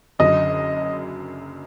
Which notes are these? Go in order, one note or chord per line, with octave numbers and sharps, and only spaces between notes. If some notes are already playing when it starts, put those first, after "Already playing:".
F#1 F#2 D3 F#3 D#5